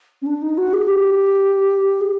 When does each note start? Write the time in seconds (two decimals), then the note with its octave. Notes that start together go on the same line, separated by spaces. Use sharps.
0.22 C#4
0.26 D4
0.42 D#4
0.58 F#4
0.73 G#4
0.88 G4
2.01 G#4